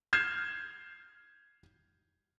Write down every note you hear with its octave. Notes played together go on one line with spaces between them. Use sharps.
F6 G6 G#6 C7 E7